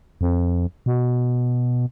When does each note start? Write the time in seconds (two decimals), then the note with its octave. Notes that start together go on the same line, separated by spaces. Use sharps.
0.21 F2
0.86 B2